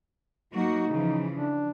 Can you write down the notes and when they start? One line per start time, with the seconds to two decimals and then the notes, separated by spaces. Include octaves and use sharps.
0.54 F#3 A#3 D#4 F#4
0.90 C#3 E3 F3
1.32 D4